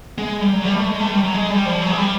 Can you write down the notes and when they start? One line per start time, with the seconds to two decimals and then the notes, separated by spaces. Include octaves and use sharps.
0.18 G#3
0.41 G3
0.53 F#3
0.65 G3
0.76 A3
0.88 G#3
1.00 A3
1.11 G3
1.23 F#3
1.34 G#3
1.50 G3
1.66 F3
1.82 F#3
1.90 G#3
1.97 G3